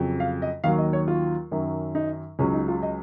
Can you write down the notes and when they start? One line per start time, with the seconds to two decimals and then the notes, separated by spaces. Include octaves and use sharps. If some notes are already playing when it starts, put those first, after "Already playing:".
Already playing: F2 C#3 F#3
0.20 F5
0.42 D#5
0.64 D#2 D#3 F#3 F5
0.78 D#5
0.93 C#5
1.08 F4
1.52 F#2 D#3 F#3
1.95 D#4
2.39 C#2 C#3 F#3 C#4
2.53 D#4
2.68 F4
2.83 D#5